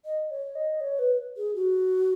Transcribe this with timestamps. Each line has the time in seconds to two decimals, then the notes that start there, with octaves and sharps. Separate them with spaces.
0.05 D#5
0.31 C#5
0.55 D#5
0.81 C#5
0.99 B4
1.37 G#4
1.55 F#4